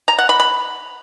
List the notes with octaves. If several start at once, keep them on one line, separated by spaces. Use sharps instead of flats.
A#5
F#5
B5
B5